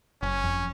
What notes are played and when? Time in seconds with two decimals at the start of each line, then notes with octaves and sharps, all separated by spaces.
0.22 F#1 C#4
0.44 F2